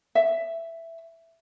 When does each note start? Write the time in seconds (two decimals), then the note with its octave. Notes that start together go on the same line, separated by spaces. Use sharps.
0.15 E5